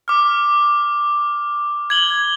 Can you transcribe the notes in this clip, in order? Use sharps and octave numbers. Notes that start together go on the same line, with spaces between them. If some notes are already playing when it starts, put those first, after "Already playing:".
D6 F6
G#6 F#7 G7